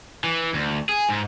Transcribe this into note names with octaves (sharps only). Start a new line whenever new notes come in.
E3
D2
G#4
G#2